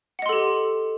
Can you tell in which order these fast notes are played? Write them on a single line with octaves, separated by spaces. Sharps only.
F#5 D#5 C6 A4 G4